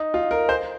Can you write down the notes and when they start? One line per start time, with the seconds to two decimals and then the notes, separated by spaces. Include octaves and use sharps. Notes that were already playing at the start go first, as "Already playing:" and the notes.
Already playing: D#4
0.14 F4
0.31 A#4
0.49 C5